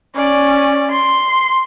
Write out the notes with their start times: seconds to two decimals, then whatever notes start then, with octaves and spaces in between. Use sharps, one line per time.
0.15 C#4 D5
0.91 C6